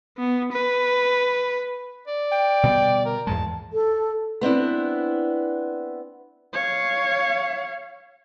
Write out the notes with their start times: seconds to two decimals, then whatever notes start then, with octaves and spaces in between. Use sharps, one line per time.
0.18 B3
0.53 B4
2.07 D5
2.32 G5
2.63 B2 D3 G3
3.06 A#4
3.27 E2 G#2 G#3 A5
3.73 A4
4.41 B3 C4 D4 E4
6.54 C#5 F5